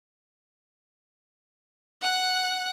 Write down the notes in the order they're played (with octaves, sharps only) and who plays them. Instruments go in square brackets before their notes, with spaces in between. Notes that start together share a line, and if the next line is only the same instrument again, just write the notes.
[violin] F#5 F#6